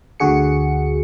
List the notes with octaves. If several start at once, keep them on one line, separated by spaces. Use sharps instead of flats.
D2 D3 F#4 G#4 C#7